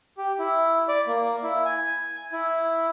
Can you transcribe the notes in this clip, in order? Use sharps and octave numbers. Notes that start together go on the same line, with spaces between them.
G4
E4
D5
A#3
E4
G#5
E4